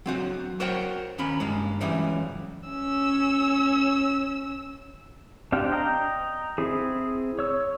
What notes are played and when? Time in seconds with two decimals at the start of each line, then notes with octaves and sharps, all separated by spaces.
0.06 F#3 C4 F#4
0.60 F#4 A#4 C5 C#5 F#5 G5
1.18 D#2 C#4 A#4 B5
1.40 G2 G#3 A#3
1.81 C#2 F#2 C#3 E3 G3
2.69 C#4 E6
5.52 C4 D4 G4 F5
5.72 D#5 G5 A#5
6.58 C4 E4 G#4
7.39 C#5 E6